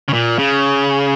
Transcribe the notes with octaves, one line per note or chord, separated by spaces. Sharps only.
C#3
A#2
C#3